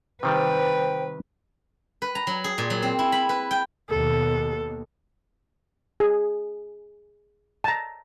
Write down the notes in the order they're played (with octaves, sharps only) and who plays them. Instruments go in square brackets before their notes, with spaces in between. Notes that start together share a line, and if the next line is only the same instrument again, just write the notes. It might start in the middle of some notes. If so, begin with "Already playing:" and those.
[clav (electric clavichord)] C3 D#3 G3 [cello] B4 [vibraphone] C5 [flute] G5
[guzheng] B4
A#5
F#3
G#4
A#2
F#3
C4
E4
B5
B4
G5
[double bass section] D#2 B2 [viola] A4
[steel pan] G#4
A5 A#5